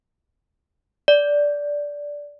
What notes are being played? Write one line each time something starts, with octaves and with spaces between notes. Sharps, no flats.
D5